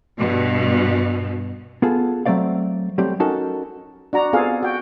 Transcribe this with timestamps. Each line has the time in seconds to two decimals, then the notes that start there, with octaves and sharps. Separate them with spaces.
0.19 G2 B2
1.82 B3 F4 G#4 A4
2.26 F#3 A3 C4 D5 F5
2.98 F#3 G3 A3 C4 G4
3.20 C#4 D#4 F#4 A4 A#4 A5
4.13 D4 F#4 A#5
4.33 B3 C4 F4 G#4 A4 F5
4.63 F#4 G5